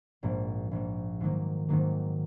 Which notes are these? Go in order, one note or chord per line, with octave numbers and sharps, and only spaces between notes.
A#1 G#2 F3 A#3
A#1 G#2 F3 A#3
G#2 D#3 F#3 A#3
G#2 D#3 F#3 A#3